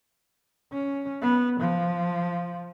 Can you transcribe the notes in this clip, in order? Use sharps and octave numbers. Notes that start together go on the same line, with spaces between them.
C#4
B3
F3